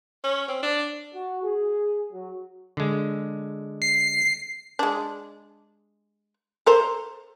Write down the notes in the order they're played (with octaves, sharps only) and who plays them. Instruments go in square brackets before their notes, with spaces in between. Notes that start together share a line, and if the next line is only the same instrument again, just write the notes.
[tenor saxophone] C#4
C4
D4
[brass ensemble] F#4
G#4
F#3
[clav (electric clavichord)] D3 G#3
[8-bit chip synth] C7
[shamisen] G#3 D4
A4 A#4 C5